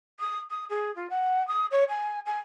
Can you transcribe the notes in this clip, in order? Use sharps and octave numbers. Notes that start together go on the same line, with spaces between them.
D#6
D#6
G#4
F4
F#5
D#6
C#5
G#5
G#5